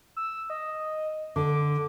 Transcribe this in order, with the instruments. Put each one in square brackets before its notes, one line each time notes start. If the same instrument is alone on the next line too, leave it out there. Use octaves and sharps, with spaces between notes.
[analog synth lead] E6
D#5
[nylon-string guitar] D3 [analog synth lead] D6